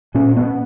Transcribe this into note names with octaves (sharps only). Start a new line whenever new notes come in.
A#2 C#4
B3